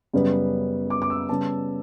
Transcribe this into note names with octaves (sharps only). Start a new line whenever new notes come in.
F#2 C#3 G3 B3
D6
D6
E6
C#3 G3 B3 A5